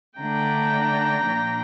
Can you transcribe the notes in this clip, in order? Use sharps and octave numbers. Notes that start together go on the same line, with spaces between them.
D3 A3 D4 G5 A#5
A#2 F3 A#3 D4